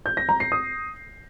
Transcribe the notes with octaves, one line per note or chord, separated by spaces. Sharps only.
G6
A#6
A#5
C7
D#6